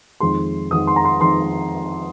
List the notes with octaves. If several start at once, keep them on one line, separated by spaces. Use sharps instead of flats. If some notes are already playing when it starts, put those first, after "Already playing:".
F2 D#3 G#3 C6
F2 D#3 G#3 D#6
C6
A#5
C6
F2 D#3 G#3 C6